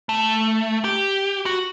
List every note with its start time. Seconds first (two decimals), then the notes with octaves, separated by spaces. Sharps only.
0.09 A3
0.84 G4
1.46 F#4